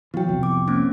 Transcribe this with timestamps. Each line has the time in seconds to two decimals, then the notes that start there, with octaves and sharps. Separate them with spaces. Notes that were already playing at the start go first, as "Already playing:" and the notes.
0.14 E3 F#3 B3 G5
0.29 C2 F2
0.43 D6
0.67 A#3 C4 C#4